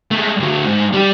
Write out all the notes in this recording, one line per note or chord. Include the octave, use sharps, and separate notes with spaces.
G#3 A3
D2 F#3
G#2
G3 G4